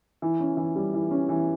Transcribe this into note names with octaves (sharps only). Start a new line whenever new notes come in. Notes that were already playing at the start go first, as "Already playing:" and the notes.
E3
C#4
E3
G3
E3
C#4
E3